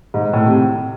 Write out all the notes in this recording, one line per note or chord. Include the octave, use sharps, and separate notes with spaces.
G#2
A2
C3